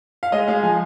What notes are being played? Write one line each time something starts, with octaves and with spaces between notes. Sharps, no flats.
F5
G#3 D#5
G#3 F5
F3 G#5